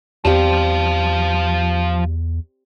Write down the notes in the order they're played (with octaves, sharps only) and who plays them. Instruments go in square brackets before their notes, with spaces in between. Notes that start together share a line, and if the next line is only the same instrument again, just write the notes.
[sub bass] E2 [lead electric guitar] F3 F5 [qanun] G3 C4 G4